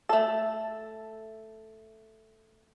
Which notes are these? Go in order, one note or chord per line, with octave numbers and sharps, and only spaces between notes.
A3 A4